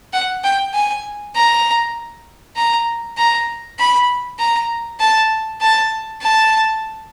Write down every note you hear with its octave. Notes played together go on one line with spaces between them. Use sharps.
F#5
G5
G#5
A#5
A#5
A#5
B5
A#5
A5
A5
A5